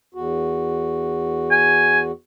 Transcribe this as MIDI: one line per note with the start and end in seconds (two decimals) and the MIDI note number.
0.14 2.12 40
0.14 2.12 66
1.51 2.01 80